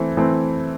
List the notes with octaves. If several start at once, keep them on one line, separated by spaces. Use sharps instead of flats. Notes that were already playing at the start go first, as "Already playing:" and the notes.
Already playing: E3 A3 C4
E3 A3 C4